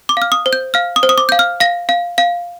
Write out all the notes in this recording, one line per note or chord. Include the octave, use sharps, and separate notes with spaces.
D6
F5 F6
D#6
C5
G6
F5 F6
D#6
C5
D#6
D6
F5 G6
F6
F5 A#6
F5
F5